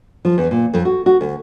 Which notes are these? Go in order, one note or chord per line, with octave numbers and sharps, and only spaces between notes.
F3
E2
A#2
F2
F#4
F#4
D2